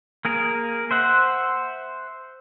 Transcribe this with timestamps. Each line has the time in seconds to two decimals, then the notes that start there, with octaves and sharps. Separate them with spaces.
0.25 A#3 G#4 A#4
0.91 C5 E5 F#5